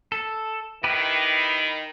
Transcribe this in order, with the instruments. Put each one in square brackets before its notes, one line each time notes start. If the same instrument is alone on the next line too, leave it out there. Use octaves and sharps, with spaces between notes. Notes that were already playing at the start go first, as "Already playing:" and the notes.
[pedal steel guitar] A4
[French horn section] D#3 [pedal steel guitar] E4 G4 B4